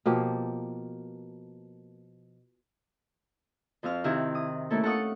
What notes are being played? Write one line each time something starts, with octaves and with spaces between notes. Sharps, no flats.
B2 F3 A#3 G4
F2 F3 C4 F5 F6
C3 D#3 E4 G4
D#6
A3 A#3 C#4 E4 A4
A4 F5 F#5 C#6 D#6